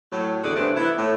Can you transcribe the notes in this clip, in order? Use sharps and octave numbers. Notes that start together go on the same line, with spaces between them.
A2 F#3
E2 D3 F#4 G#4 D5
G2 C3 E3 A3 D4
E3 B3 E4
A2